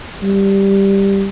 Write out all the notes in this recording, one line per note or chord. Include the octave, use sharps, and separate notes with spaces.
G3